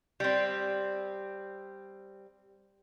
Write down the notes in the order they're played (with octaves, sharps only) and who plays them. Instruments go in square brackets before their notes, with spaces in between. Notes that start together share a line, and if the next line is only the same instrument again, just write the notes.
[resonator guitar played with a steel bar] G3 C4